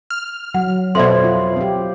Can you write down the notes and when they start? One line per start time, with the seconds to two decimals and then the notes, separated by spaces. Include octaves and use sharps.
0.10 F6
0.54 F#3 F#5
0.95 F2 B2 A4 C5 D5 E5 B5 C6
1.24 F4
1.56 C4 G4